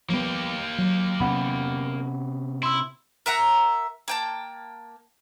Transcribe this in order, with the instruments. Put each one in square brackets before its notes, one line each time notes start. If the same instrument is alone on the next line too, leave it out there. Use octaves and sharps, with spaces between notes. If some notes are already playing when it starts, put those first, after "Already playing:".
[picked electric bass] F3 G3 B3 [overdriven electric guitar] A#3 G4
[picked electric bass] F#3
[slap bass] C3 B3 C#4 [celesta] F#5 B5
[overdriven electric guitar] E4 [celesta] C6 E6
[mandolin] A#4 E5 F#5 A#5
A#3 G5 A5